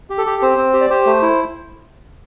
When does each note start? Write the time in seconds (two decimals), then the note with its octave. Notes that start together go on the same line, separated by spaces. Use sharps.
0.10 G4
0.18 A4
0.26 G4
0.42 C4 C5
0.58 C4
0.74 G4
0.81 D5
0.90 G4 C5
1.06 A3
1.22 E4